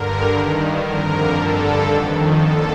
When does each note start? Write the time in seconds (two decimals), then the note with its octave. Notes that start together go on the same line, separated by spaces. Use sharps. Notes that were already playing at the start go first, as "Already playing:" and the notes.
Already playing: G2 D3 A#4
0.26 G2 D#3
0.78 F2 D3 A#4
1.31 G2 D3 A4
1.83 F2 D#3
2.36 D#2 D3 A4